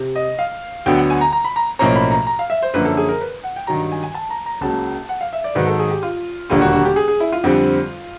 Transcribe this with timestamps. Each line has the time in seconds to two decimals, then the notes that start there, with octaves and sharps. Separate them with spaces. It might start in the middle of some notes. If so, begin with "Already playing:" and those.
Already playing: C3
0.16 D#5
0.39 F5
0.86 D2 D3 F#3 B3 G5
0.98 F#5
1.10 G#5
1.21 A#5
1.32 A#5
1.44 B5
1.56 A#5
1.79 B1 A2 F3 A#3 C#4 A#5
1.96 B5
2.11 A#5
2.27 A#5
2.39 F5
2.50 E5
2.62 C5
2.74 F#2 D3 F3 A#3 C#4 B4
2.85 A4
2.97 G#4
3.09 A#4
3.21 B4
3.44 F#5
3.56 G5
3.67 G2 D#3 F#3 A#5
3.91 G#5
4.03 G#5
4.14 A5
4.30 A#5
4.46 A#5
4.61 C#2 C#3 F#3 A#3 A5
5.09 F#5
5.21 F5
5.33 E5
5.44 D5
5.55 G#2 D#3 F#3 B4
5.67 A4
5.79 G#4
5.90 G4
6.03 F4
6.50 E1 D#2 D3 G3 A#3 F4
6.61 F#4
6.72 F#4
6.85 G4
6.96 G#4
7.08 G#4
7.20 E4
7.32 F4
7.44 F2 D3 G3 C4